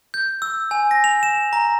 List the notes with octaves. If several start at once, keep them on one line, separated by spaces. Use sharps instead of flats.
G6
E6
G#5
A#6
F7
E7
A#5